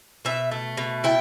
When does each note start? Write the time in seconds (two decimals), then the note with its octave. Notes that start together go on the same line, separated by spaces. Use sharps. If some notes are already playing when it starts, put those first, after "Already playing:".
0.25 B2 E5
0.51 A3
0.77 B2
1.04 E4 G5